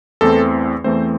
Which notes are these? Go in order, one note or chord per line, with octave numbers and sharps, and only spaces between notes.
E2 E3 A3 C4 A4
E2 E3 A3 C4 C5